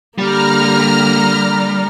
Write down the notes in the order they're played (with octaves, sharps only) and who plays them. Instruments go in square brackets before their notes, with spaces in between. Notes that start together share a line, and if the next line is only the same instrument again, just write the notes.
[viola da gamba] D3 A#3 [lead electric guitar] G3 [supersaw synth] A#5 F6